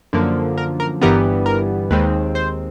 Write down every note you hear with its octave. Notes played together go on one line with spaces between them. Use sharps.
F#2 D3 F3 A#3
A#4
A#4
G1 G2 E3 G3 B3 A#4
A#4
D#2 D#3 G#3 C4 B4
C5